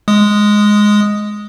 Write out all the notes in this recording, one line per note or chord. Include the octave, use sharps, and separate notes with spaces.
G#3 D#6